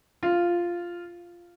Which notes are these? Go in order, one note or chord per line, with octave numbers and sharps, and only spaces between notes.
F4